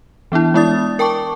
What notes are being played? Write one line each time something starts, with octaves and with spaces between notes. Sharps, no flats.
E3 B3 D4 E4
G#3 B3 E4 D5 D#6 A6
A#4 G5 A5 C#6 D6